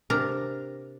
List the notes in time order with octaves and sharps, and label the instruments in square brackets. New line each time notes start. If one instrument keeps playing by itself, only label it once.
[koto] C3 D4 A#4 A#5